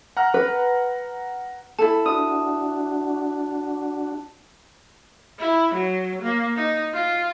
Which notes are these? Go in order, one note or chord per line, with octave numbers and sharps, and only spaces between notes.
F#5 A#5 F6
B4
E4 A4 A5
D4 F#4 D#6
E4
F#3
A#3
D#4
F4